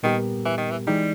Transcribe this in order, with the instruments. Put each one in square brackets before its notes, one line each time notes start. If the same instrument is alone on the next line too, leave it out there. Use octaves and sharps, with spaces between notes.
[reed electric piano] A#2 G3 B3 G4 A#4 [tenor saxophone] D#3
[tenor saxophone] E3
D#3
E3
[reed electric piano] E3 G#3 D#4 G4 [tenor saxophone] G3